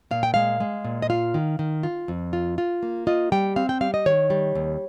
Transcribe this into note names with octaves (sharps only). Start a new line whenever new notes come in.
A#2 F5
G5
G#3 F5
G#3
A#2
D#5
F4 F5
D#3
D#3
F4
F2
F4
F4
A#3
F4 D#5
G3 G5
C4 F5
G5
G3 F5
D#5
D#3 C#5
G3
D#2